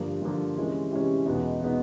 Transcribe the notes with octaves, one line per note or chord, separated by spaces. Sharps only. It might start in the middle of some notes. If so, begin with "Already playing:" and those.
Already playing: G2 D3 F3 A#3
G2 D3 F3 A#3
C3 E3 G#3 C#4
C3 E3 G#3 C#4
E2 B2 G#3 B3 D#4
B2 G#3 B3 D#4